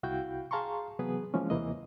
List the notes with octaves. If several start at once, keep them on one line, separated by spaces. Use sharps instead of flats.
C2 E4 F#4 F5 G5 G6
G#4 F5 A5 A#5 C6 C#6
C3 E3 F#3 B3 G#4 B4
E3 F3 G#3 A#3 C#4
D#2 C3 E3 A#3 C4 D#5